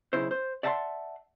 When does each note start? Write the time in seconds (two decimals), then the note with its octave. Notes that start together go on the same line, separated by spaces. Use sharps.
0.13 B1 C#3 E4 C5
0.31 C5
0.63 D5 E5 F#5 A5 B5 C6